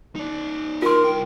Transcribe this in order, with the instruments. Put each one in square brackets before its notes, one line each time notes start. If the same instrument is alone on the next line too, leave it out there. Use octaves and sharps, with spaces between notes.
[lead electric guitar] D#4 D5
[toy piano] F4 C6 [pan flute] A#4
[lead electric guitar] C2 G5